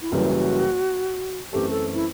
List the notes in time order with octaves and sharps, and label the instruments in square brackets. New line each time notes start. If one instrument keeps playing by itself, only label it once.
[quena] E4
[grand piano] F#1 F#2 E3 G3 [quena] F#4
[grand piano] F#2 E3 A3 C4 [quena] G4
[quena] A4
E4